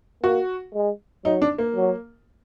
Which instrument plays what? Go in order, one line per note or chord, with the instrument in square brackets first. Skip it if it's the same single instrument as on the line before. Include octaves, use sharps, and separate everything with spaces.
[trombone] A#3 [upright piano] F#4
[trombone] G#3
[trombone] F#3 [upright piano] D#4
[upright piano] D4
A#3
[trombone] F#3